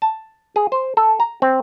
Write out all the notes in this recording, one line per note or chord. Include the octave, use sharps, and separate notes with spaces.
A5
G#4
C5
A4
A#5
C4